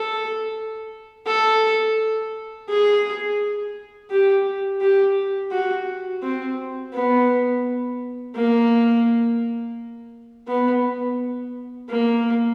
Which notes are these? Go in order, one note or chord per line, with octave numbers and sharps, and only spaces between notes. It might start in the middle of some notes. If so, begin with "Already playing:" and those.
Already playing: A4
A4
G#4
G4
G4
F#4
C4
B3
A#3
B3
A#3